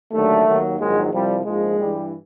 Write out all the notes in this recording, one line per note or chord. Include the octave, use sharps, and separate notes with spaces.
D#2 D3 F#3 A3
D#2 D#3 F#3
A#1 G#2 D#3 F#3 G#3
C2 C3 F3 G3
A#1 G#2 F3 G#3
G2 E3 G3